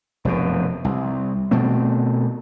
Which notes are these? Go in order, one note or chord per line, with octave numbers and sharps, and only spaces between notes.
F1 F#2 B2
C2
B2 A3 C4